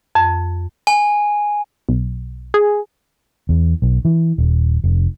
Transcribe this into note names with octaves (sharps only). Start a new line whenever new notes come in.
F2
G#5
B1
G#4
E2
B1
E3
D#1
F1